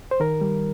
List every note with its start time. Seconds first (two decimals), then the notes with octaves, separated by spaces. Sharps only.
0.11 C5
0.20 D#3 A#4
0.41 G3